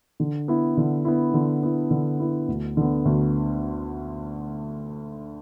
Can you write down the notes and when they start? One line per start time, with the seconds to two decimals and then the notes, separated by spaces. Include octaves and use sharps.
0.20 D3
0.48 B3 E4
0.77 D3
1.05 B3 E4
1.34 D3
1.63 B3 E4
1.91 D3
2.20 B3 E4
2.48 D2
2.77 D3 B3
3.05 D2